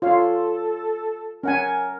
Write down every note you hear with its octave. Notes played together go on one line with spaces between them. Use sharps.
F4 A4 C#5 F5
C#4 A#4 F#5 G#5